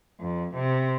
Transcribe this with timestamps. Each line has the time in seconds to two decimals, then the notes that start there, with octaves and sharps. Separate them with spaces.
0.19 F2
0.54 C3